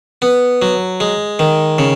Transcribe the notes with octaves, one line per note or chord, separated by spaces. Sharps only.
B3
F#3
G#3
D#3
C#3